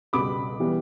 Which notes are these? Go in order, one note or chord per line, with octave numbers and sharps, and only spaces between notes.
C#2 B2 G3 B3 B5 D6
E3 G3 B3